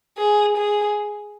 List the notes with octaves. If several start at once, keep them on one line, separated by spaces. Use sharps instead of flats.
G#4
G#4